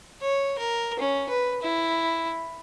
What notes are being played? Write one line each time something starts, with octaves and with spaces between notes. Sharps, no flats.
C#5
A#4
C#4
B4
E4